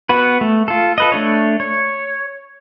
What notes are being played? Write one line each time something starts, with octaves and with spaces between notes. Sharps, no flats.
B3 F#4 B4
A3
F4 A4
A4 B4 D#5
A3 D4 C#5
C#5